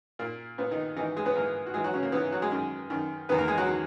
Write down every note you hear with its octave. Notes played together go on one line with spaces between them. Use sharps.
A#2 A#3
A#2 B3
D#3 D#4
G#2 D#3 E3 D#4
G#3 G#4
B3 B4
G#2 E3 A#3 A#4
F#4
G#2 E3 G#3 G#4
F#3 F#4
C#3 C#4
A#3
G#2 E3 B3
F#3 F#4
G#3 G#4
F#2 D#3
F#2 D#3
E2 D#3 B3 B4
A#3 A#4
G#3 G#4
F#3 F#4
D#3